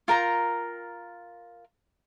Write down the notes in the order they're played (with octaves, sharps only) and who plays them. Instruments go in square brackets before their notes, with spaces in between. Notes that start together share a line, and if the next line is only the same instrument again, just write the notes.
[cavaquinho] F4 A#4 G5 A#5